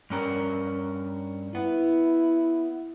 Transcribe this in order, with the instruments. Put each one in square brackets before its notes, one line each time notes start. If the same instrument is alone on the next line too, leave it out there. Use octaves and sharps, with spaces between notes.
[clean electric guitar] G2 C#4 A#4
[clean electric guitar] B3 [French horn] E4